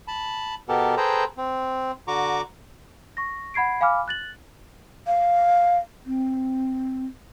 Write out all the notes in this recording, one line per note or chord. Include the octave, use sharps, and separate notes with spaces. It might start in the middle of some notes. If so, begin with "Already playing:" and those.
A5 B5
B2 B3 G4 A4 A#4
G#4 A4 B4 C5 G5 A#5
C4
D3 F#4 A#5 C#6 D6
C#6 A#6
F#5 B5 G#6 C7 D7
F5 G#5 B5 D6 F6
F#6 A6 F#7
F5
C4